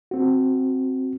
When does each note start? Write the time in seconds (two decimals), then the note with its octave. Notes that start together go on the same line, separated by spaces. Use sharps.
0.11 C4 F#4